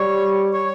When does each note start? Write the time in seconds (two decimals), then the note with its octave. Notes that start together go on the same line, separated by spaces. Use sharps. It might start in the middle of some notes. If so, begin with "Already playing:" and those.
Already playing: G3 C#5
0.54 C#5